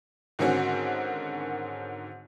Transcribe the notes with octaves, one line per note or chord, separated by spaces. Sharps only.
G#2 D3 D#3 C4 C#4 F#4